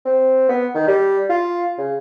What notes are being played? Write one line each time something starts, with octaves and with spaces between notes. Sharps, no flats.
C4
B3
D#3
G3
F4
C#3